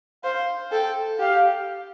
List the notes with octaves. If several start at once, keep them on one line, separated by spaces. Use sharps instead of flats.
C5 F5
A4 G5
G4 F5